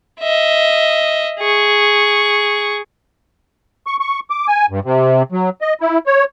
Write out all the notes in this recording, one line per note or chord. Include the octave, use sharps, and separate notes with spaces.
D#5 E5
G#4 C#6
C#6
C#6
D6
G#5
G2
C3
F#3
D#5
E4
C#5